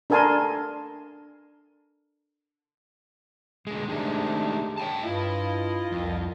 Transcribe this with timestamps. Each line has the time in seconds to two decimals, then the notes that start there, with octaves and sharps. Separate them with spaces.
0.10 D4 A4 A#4 G#5 A5 C6
3.67 B2 D3 G#3
3.88 C3 D#3 G#3 A3 D4 D#4
4.78 C#5 G5 A5
5.03 G2 E4 F4 D#5
5.92 C2 F2